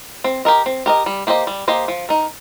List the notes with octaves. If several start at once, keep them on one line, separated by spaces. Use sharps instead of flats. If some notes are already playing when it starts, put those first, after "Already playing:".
C4
G4 A#4 D#5
C4
G4 A#4 D#5
G3
A#3 G4 C5 D#5
G3
A#3 G4 C5 D#5
F3
D#4 A#4